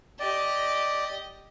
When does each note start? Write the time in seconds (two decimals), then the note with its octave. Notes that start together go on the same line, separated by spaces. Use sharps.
0.20 G4 D5 D#5